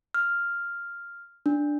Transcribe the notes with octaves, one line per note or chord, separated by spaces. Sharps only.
F6
D4